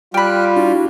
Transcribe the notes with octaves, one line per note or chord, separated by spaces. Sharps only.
G3 F4 G5 B5 F6 F#6
D4 E4 F#4